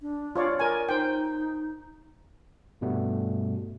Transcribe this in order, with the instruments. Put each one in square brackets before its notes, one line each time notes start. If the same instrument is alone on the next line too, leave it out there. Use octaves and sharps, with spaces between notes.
[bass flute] D4
[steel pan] F4 C#5 D5
[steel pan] A#4 G#5 [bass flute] D5
[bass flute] D#4 [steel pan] C5 G5
[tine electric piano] G2 B2 G3 A3 B3